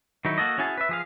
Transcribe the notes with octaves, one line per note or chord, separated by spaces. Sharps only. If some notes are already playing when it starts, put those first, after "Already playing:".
D#3 F#3 D#4 E4
A#3 F#4 A4 D#5
C#4 E4 F#4 G#4 A5
B4 E5
F3 G#4 F5